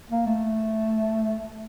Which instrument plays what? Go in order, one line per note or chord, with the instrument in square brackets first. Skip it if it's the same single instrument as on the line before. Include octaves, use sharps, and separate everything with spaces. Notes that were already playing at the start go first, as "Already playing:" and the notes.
[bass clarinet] A#3
A3